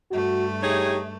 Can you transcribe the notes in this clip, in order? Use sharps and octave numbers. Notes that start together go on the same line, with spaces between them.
G2 A3 F#4
D#4 G4 G#4 C#5